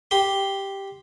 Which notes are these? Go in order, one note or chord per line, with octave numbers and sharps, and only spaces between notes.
G4 C6